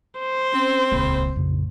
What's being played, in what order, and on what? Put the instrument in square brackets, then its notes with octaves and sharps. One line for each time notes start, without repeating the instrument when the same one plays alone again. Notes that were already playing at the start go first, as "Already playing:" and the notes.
[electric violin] C5
[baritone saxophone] C4 [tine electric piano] C#4
[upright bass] D#1 C#2 [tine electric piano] G#4 B5
[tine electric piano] A#1 F2 C#3 [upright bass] A2